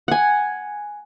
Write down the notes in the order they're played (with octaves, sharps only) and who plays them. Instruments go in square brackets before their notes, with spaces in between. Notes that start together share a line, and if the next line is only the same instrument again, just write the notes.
[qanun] F#5 G#5